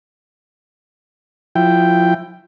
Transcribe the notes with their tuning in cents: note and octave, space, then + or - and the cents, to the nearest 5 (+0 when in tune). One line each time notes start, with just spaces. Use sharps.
F3 +25 E4 +15 G5 +0